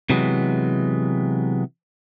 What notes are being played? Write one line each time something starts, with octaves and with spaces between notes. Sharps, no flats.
C3 E3 F#3 G#3 B3